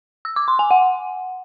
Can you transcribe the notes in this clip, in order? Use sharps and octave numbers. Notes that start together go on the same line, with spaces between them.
E6
D6
C6
G#5
F#5